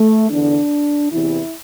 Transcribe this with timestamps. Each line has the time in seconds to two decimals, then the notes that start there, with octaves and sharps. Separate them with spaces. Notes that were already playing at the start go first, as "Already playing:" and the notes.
Already playing: A3
0.30 E2 D3 D4
1.11 E2 C3 E3 E4